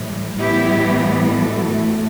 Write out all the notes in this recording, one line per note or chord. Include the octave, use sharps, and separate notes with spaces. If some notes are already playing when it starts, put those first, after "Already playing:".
Already playing: A2 E3 G3
A2 E3 G3 B3 E4 G4
F#4 A4
A2 E3 A3